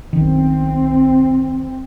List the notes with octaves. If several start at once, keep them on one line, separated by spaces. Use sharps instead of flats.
B1 D#3 C4